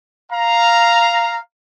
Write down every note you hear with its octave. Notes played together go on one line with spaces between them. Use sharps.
F5 A#5